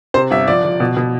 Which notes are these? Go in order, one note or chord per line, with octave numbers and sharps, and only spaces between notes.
C3 C5
G1 E5
F3 D5
F3
B2
B2